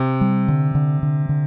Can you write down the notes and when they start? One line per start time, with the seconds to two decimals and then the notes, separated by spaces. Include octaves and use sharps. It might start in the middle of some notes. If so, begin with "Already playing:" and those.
Already playing: C3
0.21 G3
0.48 D3
0.75 D3
1.03 D3
1.29 D3